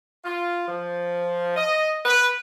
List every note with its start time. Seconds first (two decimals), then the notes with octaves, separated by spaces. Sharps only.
0.25 F4
0.67 F3
1.56 D#5
2.05 B4